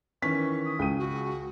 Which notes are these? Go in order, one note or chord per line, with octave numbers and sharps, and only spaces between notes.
D#3 E3 C#4 C#6 B6
D#6
C#2 G5 D#7
F#4